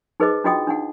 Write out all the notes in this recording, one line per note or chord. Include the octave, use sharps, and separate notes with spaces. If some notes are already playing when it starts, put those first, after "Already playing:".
D#4 G#4 B4 C5 D#5 D6
D4 F4 F#4 D#5 G5 D#6
D4 D#4 F#5